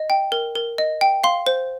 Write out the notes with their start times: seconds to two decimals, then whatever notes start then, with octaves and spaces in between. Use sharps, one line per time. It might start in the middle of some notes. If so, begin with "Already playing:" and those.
Already playing: D#5
0.10 G5
0.32 A#4
0.55 A#4
0.78 D#5
1.01 G5
1.24 F5 C6
1.46 C5